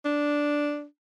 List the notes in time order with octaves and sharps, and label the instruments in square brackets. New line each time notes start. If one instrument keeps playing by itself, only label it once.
[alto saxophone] D4